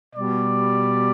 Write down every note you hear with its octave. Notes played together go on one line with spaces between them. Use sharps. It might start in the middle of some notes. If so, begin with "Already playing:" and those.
B2 G3 D5